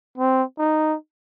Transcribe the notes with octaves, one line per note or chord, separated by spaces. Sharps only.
C4
D#4